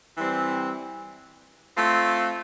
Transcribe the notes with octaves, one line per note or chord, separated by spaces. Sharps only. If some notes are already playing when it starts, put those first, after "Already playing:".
E3 G3 C4
A3 C4 F4